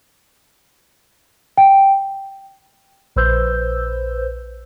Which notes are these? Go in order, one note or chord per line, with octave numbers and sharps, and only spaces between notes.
G5
A#1 B4 C5 E6 G6